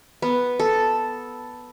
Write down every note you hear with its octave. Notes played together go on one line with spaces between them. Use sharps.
B3
A4